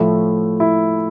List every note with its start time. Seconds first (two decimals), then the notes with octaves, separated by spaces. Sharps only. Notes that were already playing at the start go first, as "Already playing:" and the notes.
Already playing: A2 F3 A3 E4
0.60 E4